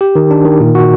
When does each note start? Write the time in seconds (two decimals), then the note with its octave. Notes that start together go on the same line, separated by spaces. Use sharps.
0.01 G4
0.15 D#3
0.31 D4
0.45 D#3
0.60 A#2
0.75 F#4